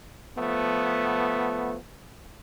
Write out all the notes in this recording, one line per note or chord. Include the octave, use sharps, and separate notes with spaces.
F3 A3 B3